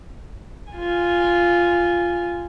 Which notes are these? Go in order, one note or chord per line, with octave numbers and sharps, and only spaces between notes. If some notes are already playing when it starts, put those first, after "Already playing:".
F4 G#5